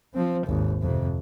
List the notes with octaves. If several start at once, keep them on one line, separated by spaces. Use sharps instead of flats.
F3 C4
G#1 D#2
F2 C3